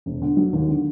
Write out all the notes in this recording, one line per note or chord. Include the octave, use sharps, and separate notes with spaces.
E1
D3
F#3
D#2
D3